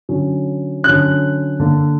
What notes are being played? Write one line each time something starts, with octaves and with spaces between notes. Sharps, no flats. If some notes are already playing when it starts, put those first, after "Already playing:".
D3 F#3 C#4
D3 F#3 C#4 F#6
D3 A#3 D4